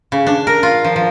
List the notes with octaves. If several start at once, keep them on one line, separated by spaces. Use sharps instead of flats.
C#3
D4
A#4
F4
F3
F3